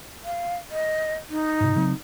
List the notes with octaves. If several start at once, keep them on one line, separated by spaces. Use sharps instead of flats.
F5
D#5
D#4
G#2 C3
C#3 F#3 C4